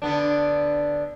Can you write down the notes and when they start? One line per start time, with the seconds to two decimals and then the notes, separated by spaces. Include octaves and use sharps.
0.02 D3 B3 D4